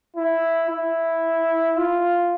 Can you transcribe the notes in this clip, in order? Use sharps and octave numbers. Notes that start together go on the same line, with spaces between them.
E4
E4
F4